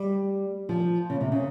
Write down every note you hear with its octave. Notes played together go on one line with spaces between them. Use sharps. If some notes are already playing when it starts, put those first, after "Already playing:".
Already playing: G3
F3
C#3
C3
C#3